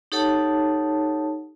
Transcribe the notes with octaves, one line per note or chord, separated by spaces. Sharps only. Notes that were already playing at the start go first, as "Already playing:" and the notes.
D#4 G4 A4 C#5 F#5 A5